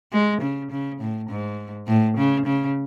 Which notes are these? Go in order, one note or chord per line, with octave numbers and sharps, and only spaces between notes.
G#3
C#3
C#3
A2
G#2
A2
C#3
C#3